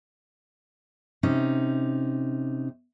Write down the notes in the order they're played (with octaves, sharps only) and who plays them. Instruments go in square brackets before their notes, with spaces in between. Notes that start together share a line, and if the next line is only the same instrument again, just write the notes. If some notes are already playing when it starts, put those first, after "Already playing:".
[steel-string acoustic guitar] C3 C#4 D#4